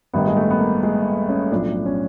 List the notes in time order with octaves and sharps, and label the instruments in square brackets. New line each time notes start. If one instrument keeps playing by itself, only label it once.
[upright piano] A1 G2 D#3 B3
G#3
A3
B3
A#3
G#3
C#4
B1 A2 F3 D4
C#4